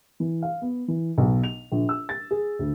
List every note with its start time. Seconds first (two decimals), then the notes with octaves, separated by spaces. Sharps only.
0.20 E3
0.42 F5
0.62 B3
0.88 E3
1.18 B1
1.44 F7
1.72 A#1
1.89 E6
2.09 A6
2.31 G#4
2.59 D2